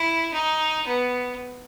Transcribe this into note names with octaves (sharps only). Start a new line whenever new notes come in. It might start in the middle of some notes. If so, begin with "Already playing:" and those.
Already playing: E4
D#4
B3